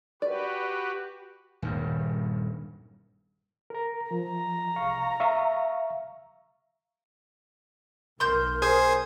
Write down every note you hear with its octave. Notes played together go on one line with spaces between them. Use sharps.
F#4 G4 B4 D5
D#1 G2
A#4 A#5
F3 A#5
C2 F5 C#6
E5 F5 C#6
B1 A#4 C6 E6 G6
G#4 C5 D#6 G#6